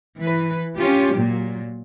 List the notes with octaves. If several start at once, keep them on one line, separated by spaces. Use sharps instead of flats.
E3 B4
C#4 F4 G4
A#2 F#3